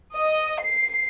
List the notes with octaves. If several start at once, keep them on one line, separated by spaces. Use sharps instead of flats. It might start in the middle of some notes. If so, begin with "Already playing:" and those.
D#5
C7